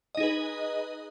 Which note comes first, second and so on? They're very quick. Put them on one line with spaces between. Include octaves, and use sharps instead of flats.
D#5 D#4 G#4 B4